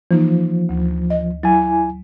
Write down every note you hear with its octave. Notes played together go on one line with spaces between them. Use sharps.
E3 F3 A#3 D#4
D2
D#5
F#3 E4 G#5